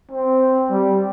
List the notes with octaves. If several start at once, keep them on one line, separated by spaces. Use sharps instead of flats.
C4
G3